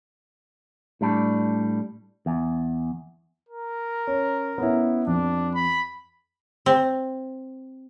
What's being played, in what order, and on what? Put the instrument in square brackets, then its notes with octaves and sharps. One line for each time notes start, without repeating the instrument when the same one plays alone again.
[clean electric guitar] A2 G3 D4
E2
[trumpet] A#4
[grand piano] C#4
B3 C#4 E4
[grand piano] F2 [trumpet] D4
[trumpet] B5
[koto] C4